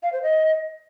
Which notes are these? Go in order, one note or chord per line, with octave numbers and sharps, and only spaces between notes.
F5
C5
D#5